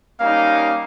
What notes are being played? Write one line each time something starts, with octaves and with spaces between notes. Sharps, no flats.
G3 A#3 C#4 D#4 F5